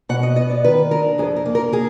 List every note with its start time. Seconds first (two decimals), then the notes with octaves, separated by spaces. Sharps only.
0.09 B2 F#5
0.23 D#5
0.36 B3 D#5
0.50 D5
0.65 D#3 B4
0.91 D4 A#4
1.18 F2 G#4
1.36 A#4
1.45 A#3
1.55 A#4
1.73 A#3 G#4